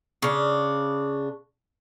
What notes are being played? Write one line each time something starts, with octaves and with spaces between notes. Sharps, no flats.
C#3 D4